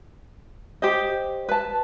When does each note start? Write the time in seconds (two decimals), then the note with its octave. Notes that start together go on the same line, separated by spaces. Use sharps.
0.82 G4 C5 D#5
1.49 B4 A5